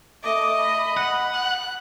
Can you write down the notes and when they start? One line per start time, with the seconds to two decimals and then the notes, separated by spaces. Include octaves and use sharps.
0.24 A3 D#5 D6
0.61 B5
0.97 F#5
1.34 F#6